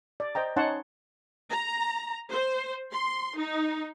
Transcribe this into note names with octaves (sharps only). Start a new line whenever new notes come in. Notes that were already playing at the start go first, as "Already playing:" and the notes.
D5
C5 D#5 G5 A#5
C#4 D#4 C#5 F#5 A5 C6
A#5
C5
C6
D#4